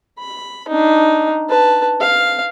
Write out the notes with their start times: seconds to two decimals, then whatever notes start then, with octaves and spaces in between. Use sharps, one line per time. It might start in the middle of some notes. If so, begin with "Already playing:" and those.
0.19 B5
0.68 D4 D#4
1.49 B4 A5
2.01 F5